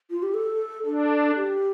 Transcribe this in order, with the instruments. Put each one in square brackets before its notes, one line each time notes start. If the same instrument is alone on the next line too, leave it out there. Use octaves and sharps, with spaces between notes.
[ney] F4
G4
A4
[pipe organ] D4 [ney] A4
[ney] G4